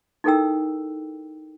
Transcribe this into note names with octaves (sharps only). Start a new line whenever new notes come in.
D#4 E4 A4 A#4 G5 E6